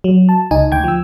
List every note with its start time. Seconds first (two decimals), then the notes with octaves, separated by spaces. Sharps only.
0.04 F#3
0.29 A5
0.51 C#2 D#4 G#5
0.72 D2 G5 G#6
0.84 F3 E6